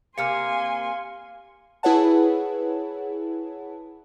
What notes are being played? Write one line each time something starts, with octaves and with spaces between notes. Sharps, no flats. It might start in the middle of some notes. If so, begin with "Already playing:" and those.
C3 A#3 F5 G#5 C6 F6 C#7
E4 G#4 B4 C#5 F#5 A5